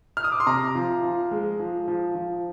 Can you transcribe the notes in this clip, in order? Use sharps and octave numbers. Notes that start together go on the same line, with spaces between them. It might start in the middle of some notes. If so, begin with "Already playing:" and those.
F6
D#6
D6
C6
C3 A#5
F3
F3
G#3
F3
F3
F3